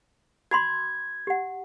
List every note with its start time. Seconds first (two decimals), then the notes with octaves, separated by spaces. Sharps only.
0.51 F#4 B5 C6 G#6
1.27 G4 F#5